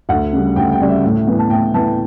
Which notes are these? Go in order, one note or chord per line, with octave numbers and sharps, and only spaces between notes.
D2 F#5
C#3 G3
D2 G5
G5
C#3 G3 D5
E5
A2
E3 B3
A5
A2 G5
E3 B3 A5